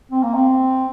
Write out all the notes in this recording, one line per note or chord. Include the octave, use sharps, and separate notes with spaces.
C4
A#3
C4